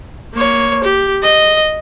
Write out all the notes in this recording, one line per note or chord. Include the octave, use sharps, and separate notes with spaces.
A#3 C#5
G4
D#5